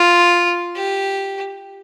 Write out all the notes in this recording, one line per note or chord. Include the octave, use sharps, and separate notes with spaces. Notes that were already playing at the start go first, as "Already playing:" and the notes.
Already playing: F4
G4